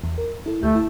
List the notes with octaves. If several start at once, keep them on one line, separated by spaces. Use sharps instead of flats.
E2
A#4
E4 A4
D2 A3 G4 G6
E4 A5